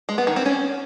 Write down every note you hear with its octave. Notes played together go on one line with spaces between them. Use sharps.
G#3
B3
D#3
C4
C#4